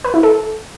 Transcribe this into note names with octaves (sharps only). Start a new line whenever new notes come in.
B4
E4
A4